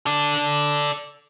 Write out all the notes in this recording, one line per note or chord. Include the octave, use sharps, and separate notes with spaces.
A4 D5